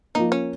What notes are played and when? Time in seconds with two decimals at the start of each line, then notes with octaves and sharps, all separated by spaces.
0.15 F3 A#3 D#4
0.32 C#4